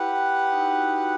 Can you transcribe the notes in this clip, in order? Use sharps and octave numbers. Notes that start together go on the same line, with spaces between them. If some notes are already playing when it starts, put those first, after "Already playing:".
Already playing: E4 G4 B4 F#5
D#4
E4
D#4 F#4
E4
D#4
D#4 F#4